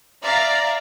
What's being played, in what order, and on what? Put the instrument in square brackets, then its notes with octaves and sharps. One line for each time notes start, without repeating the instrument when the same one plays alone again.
[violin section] D5 E5 F5 A#5